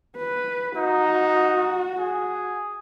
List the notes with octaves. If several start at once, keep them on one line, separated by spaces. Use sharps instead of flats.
B4
D#4 F#4
G#4